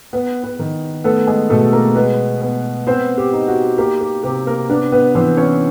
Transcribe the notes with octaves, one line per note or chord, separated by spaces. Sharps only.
B3 B4
B3 B4
D#3
A3 B3 A4
G#3 G#4
B2 A3 A4
A#3 A#4
G#3 B3 B4
B3
B3 C4 C5
G4
D#4
F#4
A#3 G4
G4
C3 G4
A#3 A#4
B3 D4 B4
B3 B4
E3 C4 C5
C#4 C#5